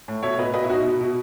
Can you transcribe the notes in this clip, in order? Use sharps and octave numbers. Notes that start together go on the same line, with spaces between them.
A2
B2 C#5 E5
B2 B4 D#5
B2 B4 D#5
E4
B2 D#4 F#4
B2
B2